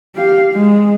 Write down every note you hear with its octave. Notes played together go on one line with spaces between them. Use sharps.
G4 F5
G#3